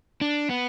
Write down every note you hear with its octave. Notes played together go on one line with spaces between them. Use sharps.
D4
B3